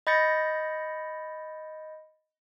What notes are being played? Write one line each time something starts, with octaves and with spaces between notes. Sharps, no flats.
D#5 B5 G6 A6 A#6 C#7